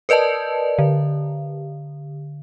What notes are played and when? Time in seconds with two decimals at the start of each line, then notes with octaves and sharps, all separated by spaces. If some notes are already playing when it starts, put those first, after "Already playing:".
0.09 A#4 B4 D5 D#5 A5
0.79 D3